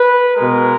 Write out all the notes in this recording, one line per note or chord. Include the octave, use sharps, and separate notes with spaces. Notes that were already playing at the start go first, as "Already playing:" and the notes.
Already playing: B4
B2 G#3 A#4